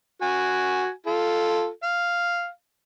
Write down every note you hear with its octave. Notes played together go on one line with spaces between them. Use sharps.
F#4 G#5
F4 A4
F5